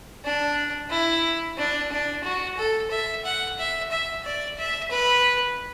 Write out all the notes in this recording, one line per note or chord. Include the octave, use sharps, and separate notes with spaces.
D4
E4
D4
D4
F#4
A4
E5
F#5
E5
E5
D5
E5
B4